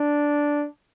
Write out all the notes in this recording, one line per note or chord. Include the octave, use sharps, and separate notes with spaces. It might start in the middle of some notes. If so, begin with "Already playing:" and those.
Already playing: D4